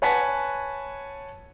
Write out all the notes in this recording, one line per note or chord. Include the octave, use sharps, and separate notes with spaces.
B4 C#5 F#5 G#5 A5 B6